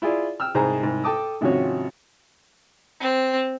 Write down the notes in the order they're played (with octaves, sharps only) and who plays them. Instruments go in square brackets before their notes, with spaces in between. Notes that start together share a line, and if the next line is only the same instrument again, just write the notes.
[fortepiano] E4 F4 G#4 D5
G5 E6 F6
C2 G#2 G#4 C5 G#5 A#5
C2 G#2
A4 G5 A5 D6 D#6
G#1 C3 F3 C#4 F#4 C#5
[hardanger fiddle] C4